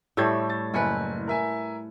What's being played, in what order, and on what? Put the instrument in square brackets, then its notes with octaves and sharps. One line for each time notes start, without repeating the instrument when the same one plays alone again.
[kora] A2 G3 A3 [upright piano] E6 G6 G#6
[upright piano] A6
[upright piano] F#1 G#5 C#7 [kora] E4 B4
[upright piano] A#4 E5 G#5